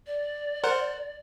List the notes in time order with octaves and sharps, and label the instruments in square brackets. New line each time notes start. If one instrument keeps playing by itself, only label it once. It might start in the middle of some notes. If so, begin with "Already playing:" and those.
[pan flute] D5
[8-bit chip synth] A#4 C5 F#5